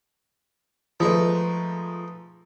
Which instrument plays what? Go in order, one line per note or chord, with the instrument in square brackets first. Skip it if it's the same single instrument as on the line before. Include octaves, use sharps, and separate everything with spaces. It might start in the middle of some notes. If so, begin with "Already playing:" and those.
[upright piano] F3 G#3 A3 [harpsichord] D#4 B4